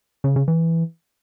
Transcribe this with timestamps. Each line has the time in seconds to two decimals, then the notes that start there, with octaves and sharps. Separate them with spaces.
0.24 C#3
0.36 C#3
0.48 E3